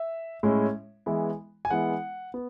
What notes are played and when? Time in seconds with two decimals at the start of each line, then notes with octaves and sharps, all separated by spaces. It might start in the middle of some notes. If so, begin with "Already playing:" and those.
Already playing: E5
0.43 A2 G#3 C#4 E4
1.06 E3 G#3 B3 E4
1.65 G#5
1.70 E3 G#3 B3 E4 F#5
2.34 B3